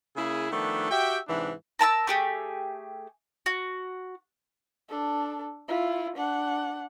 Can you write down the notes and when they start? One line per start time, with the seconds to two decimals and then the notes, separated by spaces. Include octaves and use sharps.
0.17 C#3 A#3 E4 G#4
0.51 D#3 F3 A3 B3 D4
0.91 F#4 G4 E5 G5
1.28 G#2 C3 E3 D4 E4
1.79 A#4 A5 A#5 E6
2.07 A3 G4 G#4
3.46 F#4
4.89 D4 A4
5.68 E4 F4
6.16 D4 F#5